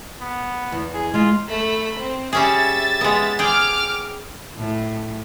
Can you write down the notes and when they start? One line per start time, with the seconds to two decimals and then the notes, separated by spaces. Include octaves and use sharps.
0.21 B3
0.72 E2
0.94 G#4
1.14 G#3 F4
1.48 A3 B5
1.99 C4
2.33 G3 C#4 G#4 E5 A6
3.01 G#3 B3
3.39 G#4 G5 D6 F6
4.57 A2